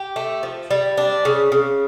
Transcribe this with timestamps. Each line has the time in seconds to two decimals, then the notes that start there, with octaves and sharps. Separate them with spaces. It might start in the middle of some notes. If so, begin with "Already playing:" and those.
Already playing: G4
0.16 A3
0.43 F3
0.71 G3
0.97 D4
1.25 C#3
1.52 C#3